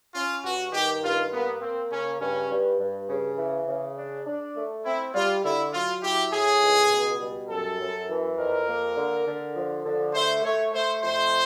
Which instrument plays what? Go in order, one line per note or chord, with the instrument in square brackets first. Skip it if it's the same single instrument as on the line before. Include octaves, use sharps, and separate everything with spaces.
[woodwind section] C#4 [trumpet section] F4
[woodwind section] G2 [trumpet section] F#4
[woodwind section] D#3 [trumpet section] G4
[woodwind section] G2 [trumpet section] F4
[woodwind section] A#3 [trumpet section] B3
[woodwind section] A#3 [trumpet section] C4
[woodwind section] C#3 [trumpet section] C#4
[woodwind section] G2 [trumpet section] C#4
[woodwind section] G2
G2
C#3
E3
C#3
D4
D4
A3
[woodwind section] C4 [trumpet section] E4
[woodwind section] G3 [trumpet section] F4
[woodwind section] D3 [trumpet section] E4
[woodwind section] F#3 [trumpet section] F4
[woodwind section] E4 [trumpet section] G4
[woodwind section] A2 [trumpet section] G#4
[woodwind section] C#2
B2
G3
[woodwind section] F#2 [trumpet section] A4
[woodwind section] F#2
E3
[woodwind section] F2 [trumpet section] A#4
[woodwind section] A#3
D3
D3
F3
D3
[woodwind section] A3 [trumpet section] C5
[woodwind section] A3 [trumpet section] C#5
[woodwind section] A3 [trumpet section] C5
[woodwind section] F2 [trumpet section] C5